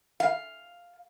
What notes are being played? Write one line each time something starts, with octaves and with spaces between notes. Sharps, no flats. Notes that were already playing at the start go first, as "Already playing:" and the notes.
F5